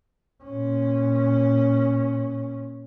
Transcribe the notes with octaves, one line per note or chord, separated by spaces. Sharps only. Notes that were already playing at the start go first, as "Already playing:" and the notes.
A#2 C#4